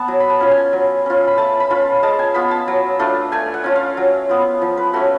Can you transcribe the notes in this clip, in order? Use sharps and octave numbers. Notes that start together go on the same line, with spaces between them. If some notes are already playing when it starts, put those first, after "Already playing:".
Already playing: B3 F#5 A5
F#3
B5
A5
C#4 F4
G#5
F#3
C#4 F4
B5
A3 A5
B5
C#4 F4
G#3 A5
G#5
B3 F4 B5
A5
F#3
A3 D4 F4
A3 G#5
F#5
C#4 F4
F5
F#3
B3 F4
F3
B4
A3 C#4 F#4